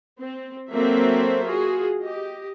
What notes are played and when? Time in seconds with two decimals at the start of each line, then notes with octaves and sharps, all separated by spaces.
0.20 C4
0.73 F#3 A#3 C4 A4 C5 E5
1.45 F4 F#4 G#4
2.03 G4 D#5